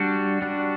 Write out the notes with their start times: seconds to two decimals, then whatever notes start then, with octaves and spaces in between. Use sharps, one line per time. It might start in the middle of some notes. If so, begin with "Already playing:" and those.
Already playing: G3 D4 F#4
0.42 G3 D4 F#4